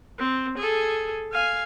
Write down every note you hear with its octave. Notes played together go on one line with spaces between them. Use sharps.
C4
G#4 A4
F5 G#5